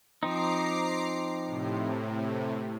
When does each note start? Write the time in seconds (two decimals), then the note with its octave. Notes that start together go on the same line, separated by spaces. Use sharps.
0.23 F3 C4 D#4 A#5 D6 C7
1.46 A2 C3